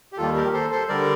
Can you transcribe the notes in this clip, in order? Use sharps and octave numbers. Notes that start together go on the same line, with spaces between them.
G4
D#2 D#3 G3 F4 A4
G4 A#4
A4 C5
A4 C5
D3 G3 A#4 D5